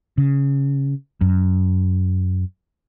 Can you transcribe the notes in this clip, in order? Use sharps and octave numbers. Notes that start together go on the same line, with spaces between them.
C#3
F#2